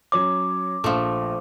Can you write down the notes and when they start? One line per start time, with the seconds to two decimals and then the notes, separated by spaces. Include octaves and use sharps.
0.12 F#3 C#4 C#5 D6
0.84 A#1 A#2 F3 A3